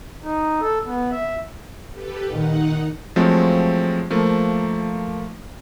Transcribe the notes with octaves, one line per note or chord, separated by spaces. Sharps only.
D#4
A4
B3
E5
G4 A4 B4
A#2 D#3 D#4 F#5
F3 F#3 G#3 A3 C4
F3 A3 A#3